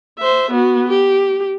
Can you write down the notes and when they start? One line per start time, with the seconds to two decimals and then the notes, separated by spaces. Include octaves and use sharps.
0.19 C5 E5
0.51 B3 F#4
0.88 G4